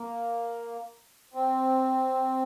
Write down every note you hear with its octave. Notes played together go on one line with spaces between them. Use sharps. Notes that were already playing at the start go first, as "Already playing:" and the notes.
Already playing: A#3
C4